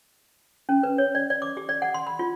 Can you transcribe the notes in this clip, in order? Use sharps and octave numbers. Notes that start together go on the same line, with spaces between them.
C#4
B4
C#5
D5
D5
D6
G4
D5
F#5
C6
B5
F4